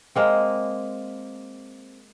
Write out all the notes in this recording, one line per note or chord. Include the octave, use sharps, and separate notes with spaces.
G#3 A#3 C4